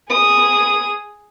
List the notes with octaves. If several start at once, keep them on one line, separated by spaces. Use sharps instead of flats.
G#4 D#6